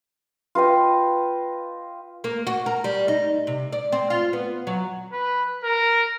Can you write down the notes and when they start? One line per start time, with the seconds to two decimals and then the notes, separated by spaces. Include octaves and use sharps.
0.55 F4 B4 D#5 G5
2.24 A#3
2.47 F#4
2.66 A#4
2.84 G3
3.08 D#4
3.47 C3
3.72 D5
3.92 C4
4.10 F4
4.33 B3
4.67 F#3
5.12 B4
5.64 A#4